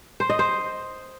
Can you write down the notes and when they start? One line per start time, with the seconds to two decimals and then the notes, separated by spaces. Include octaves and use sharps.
0.20 C5
0.30 D#5
0.39 C5